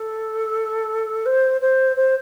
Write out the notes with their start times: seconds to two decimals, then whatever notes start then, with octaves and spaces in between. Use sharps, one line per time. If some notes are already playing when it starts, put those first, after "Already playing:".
Already playing: A4
1.25 C5
1.61 C5
1.96 C5